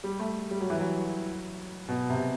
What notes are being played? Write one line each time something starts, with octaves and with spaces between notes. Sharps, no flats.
G3
A3
G3
F#3
E3
F#3
B2
C3